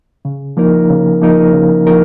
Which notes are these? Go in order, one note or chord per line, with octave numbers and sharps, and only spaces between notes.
C#3
F3 A#3 D#4 A#4
C#3
F3 A#3 D#4 A#4
C#3
F3 A#3 D#4 A#4